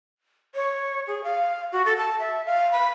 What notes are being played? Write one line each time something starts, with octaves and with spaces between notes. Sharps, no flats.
C#5
G#4
F5
F#4
A4
A5
E5
F5
B5